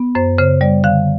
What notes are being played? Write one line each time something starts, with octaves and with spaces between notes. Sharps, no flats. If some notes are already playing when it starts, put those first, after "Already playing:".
Already playing: B3
F#2 C5
C#3 C5
G3 D5
D3 F5